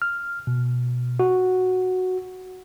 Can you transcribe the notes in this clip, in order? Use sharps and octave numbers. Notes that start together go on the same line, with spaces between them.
F6
B2
F#4